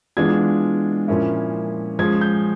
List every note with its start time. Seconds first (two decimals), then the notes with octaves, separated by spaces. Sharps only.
0.17 E3 G#3 B3 D4 F4 G#6
1.08 A#2 F3 A#3 C#4 E4
1.99 F3 G#3 C#4 F4 G#6
2.21 G6